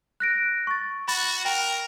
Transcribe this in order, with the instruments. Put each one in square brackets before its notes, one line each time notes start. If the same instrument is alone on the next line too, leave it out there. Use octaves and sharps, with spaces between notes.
[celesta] F#6 A#6 D7
C#6 A6
[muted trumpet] F#4 [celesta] B5 A6
[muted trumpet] A#4 [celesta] G5